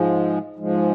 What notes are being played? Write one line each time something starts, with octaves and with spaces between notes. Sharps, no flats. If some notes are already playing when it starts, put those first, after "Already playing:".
Already playing: G#2 F3 G#3
G#2 F3 G#3